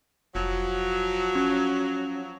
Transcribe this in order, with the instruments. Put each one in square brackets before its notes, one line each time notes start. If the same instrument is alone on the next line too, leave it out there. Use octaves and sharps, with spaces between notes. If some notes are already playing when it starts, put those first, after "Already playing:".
[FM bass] F1 [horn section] F3 F#3
[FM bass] C#4